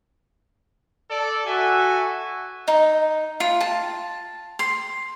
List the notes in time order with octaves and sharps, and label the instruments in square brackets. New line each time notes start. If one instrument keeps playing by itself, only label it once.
[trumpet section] A4 D5
[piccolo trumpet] F#4 [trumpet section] A4 E5 G#5
[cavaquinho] D#4
F4
A5
C6